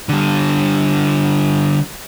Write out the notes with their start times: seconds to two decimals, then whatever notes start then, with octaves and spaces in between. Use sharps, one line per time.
0.09 D3 G3